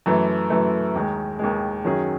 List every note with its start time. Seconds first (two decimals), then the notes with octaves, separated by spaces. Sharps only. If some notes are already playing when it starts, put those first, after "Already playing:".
0.06 F#2 E3 A3
0.50 F#2 E3 A3
0.95 D#2 D#3 G#3
1.39 D#2 D#3 G#3
1.84 F#2 D#3 F#3 C#4 G#4